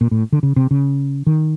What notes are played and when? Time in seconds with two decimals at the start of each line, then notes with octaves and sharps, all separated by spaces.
0.01 A#2
0.11 A2
0.32 D3
0.43 C#3
0.56 C3
0.71 C#3
1.27 D#3